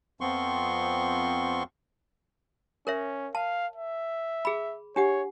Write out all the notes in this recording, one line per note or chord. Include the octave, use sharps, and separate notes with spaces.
F2 F3 B3 C4 C6 C#6
C#4 A#4 C#5 E5
F5 A5
E5
G#4 B5
D4 G4 C#5 F#5